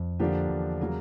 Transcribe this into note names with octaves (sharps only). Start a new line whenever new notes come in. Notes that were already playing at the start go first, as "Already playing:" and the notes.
Already playing: F2
D3 F3 A#3 D4 G4
E2
C#3 F#3 A#3